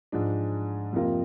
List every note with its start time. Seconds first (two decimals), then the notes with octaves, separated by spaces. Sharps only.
0.12 G#2 F3 G#3 D4
0.93 F2 C3 F3 A#3 F4